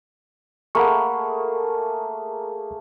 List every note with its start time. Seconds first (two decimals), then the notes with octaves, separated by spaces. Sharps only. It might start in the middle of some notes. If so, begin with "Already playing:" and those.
0.75 A3 A#3 G#4 F#5 B5 C#6